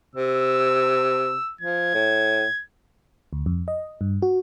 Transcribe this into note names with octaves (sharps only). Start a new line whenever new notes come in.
C3 E6
F3 G#6
A2
D2
F2
D#5
G2
F#4